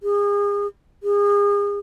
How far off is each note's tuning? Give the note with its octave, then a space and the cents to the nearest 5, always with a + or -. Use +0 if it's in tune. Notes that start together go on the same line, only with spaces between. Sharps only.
G#4 -35
G#4 -35